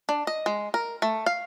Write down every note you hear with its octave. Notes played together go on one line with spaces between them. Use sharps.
D4
D#5
G#3
A#4
A3
F5